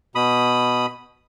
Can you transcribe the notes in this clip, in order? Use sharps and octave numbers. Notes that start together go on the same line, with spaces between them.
B2 B5 D#6